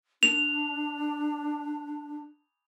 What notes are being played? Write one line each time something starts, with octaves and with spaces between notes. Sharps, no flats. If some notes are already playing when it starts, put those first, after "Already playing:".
D4 F7